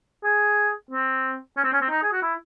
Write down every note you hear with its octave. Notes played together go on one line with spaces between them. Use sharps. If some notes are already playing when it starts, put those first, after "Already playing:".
G#4
C4
C#4
C4
C#4
C4
D#4
G#4
F#4
E4